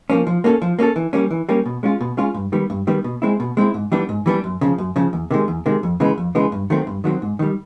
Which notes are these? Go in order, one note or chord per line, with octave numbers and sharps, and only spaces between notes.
F3 A#3 C#4
F3
A#3 C#4 F#4 A4
F3
A#3 C#4 F#4 A4
E3
G3 A#3 C#4
E3
G3 A#3 C#4
B2
G#3 C#4 F4
B2
G#3 C#4 F4
G2
D#3 G3 B3
G2
D#3 G3 B3
B2
G#3 C4 E4
B2
G#3 C4 E4
G#2
E3 G3 B3 D4
G#2
E3 G3 B3 D4
F#2
C#3 F3
F#2
C#3 F3
E2
C3 D#3 G#3
E2
C3 D#3 G#3
F2
C#3 E3 G#3 B3
F2
C#3 E3 G#3 B3
G2
D#3 F#3 A3 C4
G2
D#3 F#3 A3 C4
G#2
D#3 G3